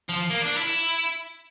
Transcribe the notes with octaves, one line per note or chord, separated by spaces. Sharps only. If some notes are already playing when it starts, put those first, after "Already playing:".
F3
A#3
D4
E4